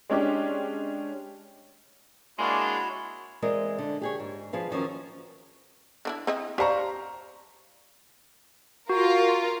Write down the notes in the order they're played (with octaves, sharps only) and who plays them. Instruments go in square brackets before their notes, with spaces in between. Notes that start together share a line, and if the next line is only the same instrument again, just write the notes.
[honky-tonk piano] G#3 C#4 D4 G4
[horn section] G#3 A#3 D4 [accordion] E4 F#4 C#5
[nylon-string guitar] E3 G#3 C4 A#4 D5 D#5
D3
G4 G#4 C#5
G#2
F3 G#4 B4 F5
D#3 F3 F#3 C#4 A#4
[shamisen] D3 D4 E4
C4 E4 D#5
[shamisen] G4 A5 [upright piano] C5 F5 A#5 [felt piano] D5 C#6
[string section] F4 A#4 [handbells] F#4